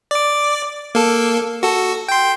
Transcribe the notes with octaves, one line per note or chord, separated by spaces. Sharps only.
D5 D6
A#3 A4
F#4 A4
G5 C6